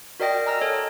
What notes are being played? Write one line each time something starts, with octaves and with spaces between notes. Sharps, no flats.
F#4 A#4 D5 D#5 G5 A#6
G#5 A#5 E6 F6 A#6
A4 C#5 D#5